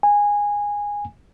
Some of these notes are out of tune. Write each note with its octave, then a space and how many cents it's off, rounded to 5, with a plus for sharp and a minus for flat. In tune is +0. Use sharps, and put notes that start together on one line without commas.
G#5 -15